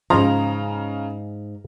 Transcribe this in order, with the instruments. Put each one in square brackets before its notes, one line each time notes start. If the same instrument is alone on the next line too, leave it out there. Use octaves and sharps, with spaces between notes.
[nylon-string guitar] G#2 D#5 F5 [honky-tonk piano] C#3 A#5 [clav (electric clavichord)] F3